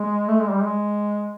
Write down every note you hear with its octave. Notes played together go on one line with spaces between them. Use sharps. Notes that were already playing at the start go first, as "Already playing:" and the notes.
Already playing: G#3
A3
G#3
G3
G#3